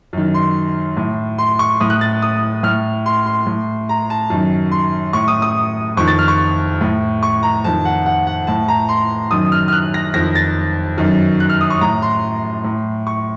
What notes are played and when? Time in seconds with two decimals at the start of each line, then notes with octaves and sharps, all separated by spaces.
0.13 F#2 D#3
0.34 C6
0.97 A2
1.39 C6
1.59 C#6
1.80 A2 D#6
1.90 F#6
2.01 A6
2.22 D#6
2.63 A2 F6
3.06 C6
3.26 C6
3.46 A2
3.89 A#5
4.10 A5
4.30 F#2 D#3
4.72 C6
5.13 A2 C#6
5.28 D#6
5.42 D#6
5.97 F2 D#3 C#6
6.08 A6
6.19 F6
6.28 C#6
6.81 A2
7.23 C#6
7.43 A#5
7.64 F2 D#3 A5
7.85 F#5
8.06 F#5
8.27 F#5
8.47 A2 A5
8.68 A#5
8.89 C6
9.31 F#2 D#3 D#6
9.52 F6
9.68 F6
9.73 F#6
9.94 A#6
10.14 F2 D#3 A#6
10.35 A6
10.98 F#2 D#3
11.40 F#6
11.50 F6
11.61 D#6
11.70 C#6
11.81 A2 A#5
12.02 C6
12.64 A2
13.07 C#6